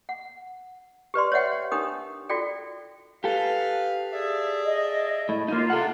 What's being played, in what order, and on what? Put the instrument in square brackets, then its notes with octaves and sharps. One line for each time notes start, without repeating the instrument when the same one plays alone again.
[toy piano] F#5
G4 B4 D5 C6
C#5 D5 E5 F#5 G5
D4 D#4 G4 A#4 D#6
F4 F#4 A4 D5 G5
[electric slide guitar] G4 A4 [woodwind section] B4 F5
[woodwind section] G#4 D5 E5
[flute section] D#5
[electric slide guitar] A2
[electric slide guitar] A#3 D#4 [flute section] F4
[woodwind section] C3 [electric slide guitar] A4 F#5